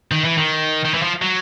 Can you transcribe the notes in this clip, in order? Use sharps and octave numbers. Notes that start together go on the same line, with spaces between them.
D#3
E3
D#3
D#3
E3
F3
F#3